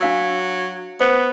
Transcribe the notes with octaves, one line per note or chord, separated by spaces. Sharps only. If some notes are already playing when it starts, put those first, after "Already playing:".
F#3 D4 F5 E6
B3 C5